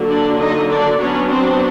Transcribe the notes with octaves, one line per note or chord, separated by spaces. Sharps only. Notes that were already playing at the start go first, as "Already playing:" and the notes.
Already playing: D3 F#3 A#3
D4 D5
D#4 D#5
D4 D5
F#3 B3 C#4 D4 C#5
C4 C5